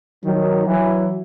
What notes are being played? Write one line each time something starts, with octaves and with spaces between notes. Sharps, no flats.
D#3 F#3
E3 F#3